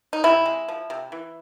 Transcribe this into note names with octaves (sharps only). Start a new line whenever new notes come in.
D#4
C3 E4
G#3
F3
C3
E3